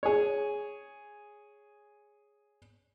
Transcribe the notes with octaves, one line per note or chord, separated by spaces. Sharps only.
G#4 C#5